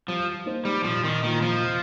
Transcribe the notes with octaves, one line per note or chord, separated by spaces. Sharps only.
F3 G3
A#3 D#4 C5
G3
A#2 F3
D#3
D#3 A#3 F4
F3
C3